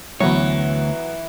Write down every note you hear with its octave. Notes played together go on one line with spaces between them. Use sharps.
D2 E3 F#3 B3 C#5